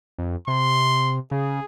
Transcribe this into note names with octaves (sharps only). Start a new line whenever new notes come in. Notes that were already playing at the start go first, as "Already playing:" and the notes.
F2
C3 C6
C#3 G#4